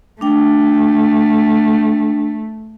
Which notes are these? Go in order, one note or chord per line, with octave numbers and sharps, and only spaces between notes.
A3 D4 G5